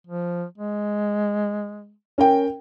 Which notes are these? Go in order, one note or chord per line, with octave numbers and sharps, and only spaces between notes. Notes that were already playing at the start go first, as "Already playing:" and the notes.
F3
G#3
C#4 A#4 G5